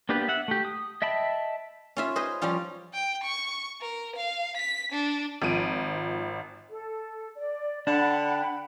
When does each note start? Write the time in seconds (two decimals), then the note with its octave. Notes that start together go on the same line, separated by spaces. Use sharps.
0.09 A#3 B3 D4 G4 B4
0.28 E5 F#5
0.48 A3 G4
0.65 D#6
1.02 D#5 E5 G5 A5 B5
1.97 C#4 F4 E5
2.16 G#4 B4 C5 D#5
2.41 F3 G3 C#4 F4
2.93 G5
3.24 C#6
3.81 A#4
4.16 F5
4.57 B6
4.92 D4
5.42 G#1 F3 D7 D#7
6.69 A4
7.35 D5
7.87 D3 D4 F#5 G5 B5